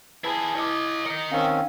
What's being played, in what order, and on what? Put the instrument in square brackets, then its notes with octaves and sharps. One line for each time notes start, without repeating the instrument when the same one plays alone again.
[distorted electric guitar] E4 G#4 [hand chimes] B4 A5 B5
[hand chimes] E4 D6 [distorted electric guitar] C#5 D#5
[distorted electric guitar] A#4 D#5 [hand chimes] C#7
[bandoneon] D#3 C4 C#4 [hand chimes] F5